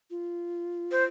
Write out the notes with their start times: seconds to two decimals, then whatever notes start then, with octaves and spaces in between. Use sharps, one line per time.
0.10 F4
0.92 C5